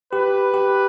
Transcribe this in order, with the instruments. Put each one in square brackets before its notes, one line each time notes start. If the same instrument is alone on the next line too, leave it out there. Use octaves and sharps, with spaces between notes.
[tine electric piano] G4 [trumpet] B4
[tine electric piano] G4